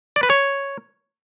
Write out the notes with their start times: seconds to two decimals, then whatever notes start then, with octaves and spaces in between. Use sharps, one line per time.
0.16 D5
0.23 B4
0.30 C#5